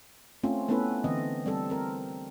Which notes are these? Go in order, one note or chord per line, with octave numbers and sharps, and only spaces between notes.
A3 C4 C#4 F4
A3 B3 C#4 E4 A4 B4
D3 E3 C4 D#5
G3 C4 A4
C4 A#4